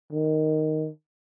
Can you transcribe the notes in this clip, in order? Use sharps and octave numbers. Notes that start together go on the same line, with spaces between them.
D#3